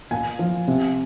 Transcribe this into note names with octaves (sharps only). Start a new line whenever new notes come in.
A#2 G#5
F3
C3